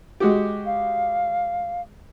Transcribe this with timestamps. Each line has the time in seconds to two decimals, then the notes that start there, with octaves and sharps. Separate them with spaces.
0.20 G#3 F#4 G4
0.66 F5